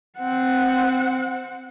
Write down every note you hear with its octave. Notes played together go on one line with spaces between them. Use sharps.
C4 F#5